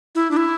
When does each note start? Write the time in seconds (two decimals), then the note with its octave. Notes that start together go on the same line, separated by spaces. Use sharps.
0.15 E4
0.31 D4
0.37 E4